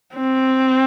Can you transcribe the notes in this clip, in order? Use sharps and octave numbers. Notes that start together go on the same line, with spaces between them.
C4